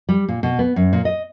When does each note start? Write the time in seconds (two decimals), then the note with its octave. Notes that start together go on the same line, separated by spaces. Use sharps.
0.09 G3
0.29 A#2
0.43 B2
0.59 B3
0.76 F#2
0.93 A#2
1.05 D#5